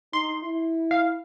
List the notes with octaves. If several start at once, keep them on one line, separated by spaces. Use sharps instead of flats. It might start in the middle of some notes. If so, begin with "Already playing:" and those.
D#4 C6
E4
F5